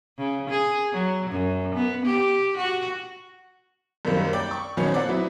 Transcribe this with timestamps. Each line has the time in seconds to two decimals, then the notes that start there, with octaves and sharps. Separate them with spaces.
0.18 C#3
0.50 G#4
0.93 F#3
1.30 F#2
1.75 B3
2.06 G4
2.58 F#4
4.05 F#2 D#3 G3 A#3 C4
4.33 D5 G5
4.51 C#6
4.77 F2 A#2 D#3 F#3 B3 C#4
4.92 C4 D5 F#5
5.09 F#3 B3 C4 E4